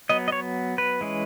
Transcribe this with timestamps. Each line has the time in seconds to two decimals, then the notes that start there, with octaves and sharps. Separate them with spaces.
0.09 F#3 B3 D#5
0.28 D#5
0.32 C#5
0.78 B4
1.01 E3 G#3 C#4